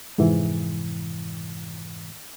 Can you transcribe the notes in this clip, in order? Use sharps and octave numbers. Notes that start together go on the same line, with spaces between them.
F2 G#2 C3 E3